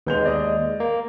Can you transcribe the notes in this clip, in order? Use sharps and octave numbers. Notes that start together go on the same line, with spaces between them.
D#2 G#3 B3 G6 F7
D5 D#5
A#3